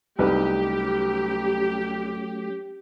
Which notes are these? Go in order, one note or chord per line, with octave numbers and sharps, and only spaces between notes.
C2 F#3 A3 C#4 D#4 G4 B4